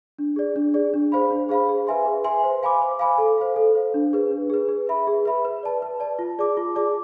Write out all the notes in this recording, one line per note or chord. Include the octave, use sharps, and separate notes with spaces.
D4
G#4 D5
D4
G#4 D5
D4
G#4 C5 F5 B5
D4
G#4 C5 F5 B5
G#4
B4 E5 G#5 C6
G#4
B4 E5 G#5 C6
C5
F5 G#5 B5 D6
C5
F5 G#5 B5 D6
A4
C5 F5
A4
C5 F5
D4
G#4 B4
D4
G#4 B4
G#4
B4 E5 B5
G#4
B4 E5 B5
B4
D5 A5
B4
D5 A5
F4
G#4 D5 A5 D6
F4
G#4 D5 A5 D6